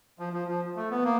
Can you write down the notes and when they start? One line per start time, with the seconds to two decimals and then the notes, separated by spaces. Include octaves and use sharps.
0.19 F3
0.33 F3
0.48 F3
0.76 A3
0.91 B3
1.04 A#3